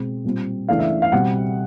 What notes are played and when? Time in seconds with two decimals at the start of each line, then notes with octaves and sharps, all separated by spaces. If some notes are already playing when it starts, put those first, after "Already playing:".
Already playing: B2 G#3 C4
0.24 A#2 G3 C4
0.69 C#2 C#3 E3 A3 D4 F5
0.79 E5
1.02 F5
1.12 B2 G3 C4 F#5